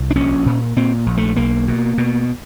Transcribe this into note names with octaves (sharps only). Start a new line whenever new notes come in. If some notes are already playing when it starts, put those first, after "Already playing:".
Already playing: C2
D4
A#1 C#4
A#2
A#2 C4
A#1
A3
B1 A#3
B2
B2